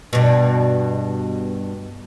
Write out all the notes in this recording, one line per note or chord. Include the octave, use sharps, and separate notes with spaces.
G2 B2